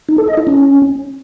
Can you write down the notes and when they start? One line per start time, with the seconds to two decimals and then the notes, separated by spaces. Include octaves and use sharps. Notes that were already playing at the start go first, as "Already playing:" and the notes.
0.09 D#4
0.18 A4
0.28 D#5
0.37 E4
0.47 C#4